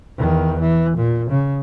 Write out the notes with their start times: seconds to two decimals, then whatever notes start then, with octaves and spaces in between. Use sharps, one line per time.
0.17 E2 D#3
0.60 E3
0.97 A#2
1.30 C#3